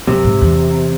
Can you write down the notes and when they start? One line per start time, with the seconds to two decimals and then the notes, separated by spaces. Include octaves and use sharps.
0.07 F#2 C3
0.24 G#2
0.41 E2